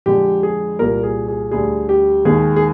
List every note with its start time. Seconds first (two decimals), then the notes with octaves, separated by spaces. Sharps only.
0.06 F2 D3 G#3 G4
0.43 G#4
0.79 C2 A#2 G3 A#4
1.03 G#4
1.28 G#4
1.51 D2 D3 G3 G#4
1.89 G4
2.25 D#2 D#3 G#3 G#4
2.56 G#4